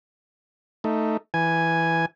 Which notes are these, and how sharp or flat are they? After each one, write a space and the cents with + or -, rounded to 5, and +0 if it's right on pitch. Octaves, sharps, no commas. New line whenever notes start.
A3 +5 D#4 +0
E3 +0 G#5 +0